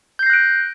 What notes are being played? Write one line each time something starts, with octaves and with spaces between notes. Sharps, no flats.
F#6 G6 A#6 C7 D7